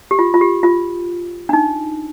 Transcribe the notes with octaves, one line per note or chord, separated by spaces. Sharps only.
G4
F4
F4
G4
F4
D4
D#4